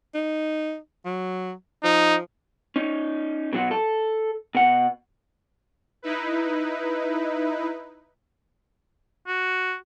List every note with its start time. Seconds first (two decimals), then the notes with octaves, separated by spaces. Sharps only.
0.15 D#4
1.05 F#3
1.84 F3 D#4
2.76 C#4 D#4
3.53 B2 F#3 F#4
3.71 A4
4.55 B2 F#5
6.02 D#4 E4 B4
9.27 F#4